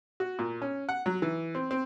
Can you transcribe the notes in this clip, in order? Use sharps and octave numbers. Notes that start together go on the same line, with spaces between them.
F#4
A#2
C#4
F#5
F#3
E3
C4
C4